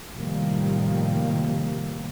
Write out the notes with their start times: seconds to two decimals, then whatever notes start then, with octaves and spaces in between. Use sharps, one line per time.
0.11 A2 C3 D#3 F3 G3 A#3